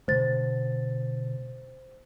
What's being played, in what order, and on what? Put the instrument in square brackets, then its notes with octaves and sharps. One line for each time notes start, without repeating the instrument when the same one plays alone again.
[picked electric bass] B2 D3 G#3 [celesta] C5 A6